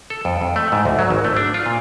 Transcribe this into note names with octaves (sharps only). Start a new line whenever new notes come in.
A4
F2
F2
A3
G#2
D2
F#3
G#1
A3
D4
F4
A#2